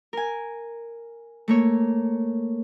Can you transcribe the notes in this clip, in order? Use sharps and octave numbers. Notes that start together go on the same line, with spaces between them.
A#4 G#5
A3 A#3 C#5